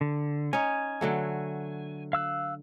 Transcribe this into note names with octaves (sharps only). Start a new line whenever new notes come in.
D3
C#4 D#4 G#5
D3 F#3 A3
F5 E6 F#6